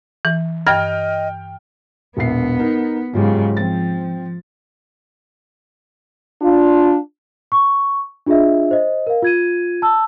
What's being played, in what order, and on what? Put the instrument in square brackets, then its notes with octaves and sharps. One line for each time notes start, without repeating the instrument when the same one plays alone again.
[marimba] E3
[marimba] G2 G#6 [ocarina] D#5 [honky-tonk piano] G5 F6
[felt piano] E1 A#1 C7 [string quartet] B3
[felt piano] D#4 A#4
[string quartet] G#2 C#3 [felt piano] F#3 F4 G4
[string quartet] F3 [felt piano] C4 A6
[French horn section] D4 F4
[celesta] C#6
D4 F4 G#4 D#5 E5
C5 D#5
A#4 F5
F4 G#6 D#7
A5 E6